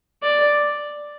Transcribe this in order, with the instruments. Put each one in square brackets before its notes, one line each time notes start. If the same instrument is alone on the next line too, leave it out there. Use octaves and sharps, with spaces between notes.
[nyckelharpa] D5